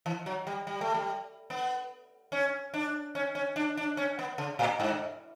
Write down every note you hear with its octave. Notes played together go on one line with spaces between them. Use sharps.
E3
F#3
G3
G3
A3
G3
B3
C#4
D4
C#4
C#4
D4
D4
C#4
B3
C#3
A2
G2